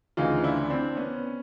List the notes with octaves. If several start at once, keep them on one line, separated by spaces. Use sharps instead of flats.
D2 C#3 E3 D#4 F4
D4 E4
C4 D4
B3 C#4